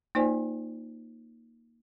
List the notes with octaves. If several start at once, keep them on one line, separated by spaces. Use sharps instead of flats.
A#3 D#4 F4 C5 D5 G#5